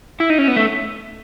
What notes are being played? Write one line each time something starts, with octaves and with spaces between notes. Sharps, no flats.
E4
D#4
C#4
B3
A3